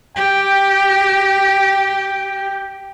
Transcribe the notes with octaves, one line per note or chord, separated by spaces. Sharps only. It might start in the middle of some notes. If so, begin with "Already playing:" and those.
G4 G5